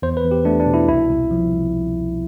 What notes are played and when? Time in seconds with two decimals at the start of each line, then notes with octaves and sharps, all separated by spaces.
0.02 E2 C5
0.17 B4
0.24 E2
0.31 G4
0.45 A3 D4
0.60 D4
0.67 B2
0.74 E4
0.88 C2 E4
1.10 C2
1.31 F3
1.52 C2